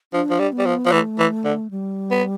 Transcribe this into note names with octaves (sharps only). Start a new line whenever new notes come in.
F3 D4
F3
G3
B3
G3
F3
F3
E3 A3
E3
D3
G3
B3